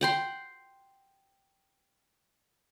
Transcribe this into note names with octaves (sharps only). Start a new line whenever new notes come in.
F#5 G5 C6